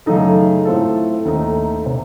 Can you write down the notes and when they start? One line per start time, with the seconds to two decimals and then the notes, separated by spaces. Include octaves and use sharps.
0.06 F#2 C#3 A3 D#4 A4
0.65 A2 A3 C4 F4 A4
1.25 D#2 D#3 A3 D#4
1.86 C3